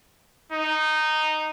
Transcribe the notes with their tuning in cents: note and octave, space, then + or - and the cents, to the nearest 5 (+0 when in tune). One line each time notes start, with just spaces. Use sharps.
D#4 -10